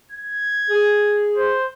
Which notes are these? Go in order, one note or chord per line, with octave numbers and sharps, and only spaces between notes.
G#6
G#4
C5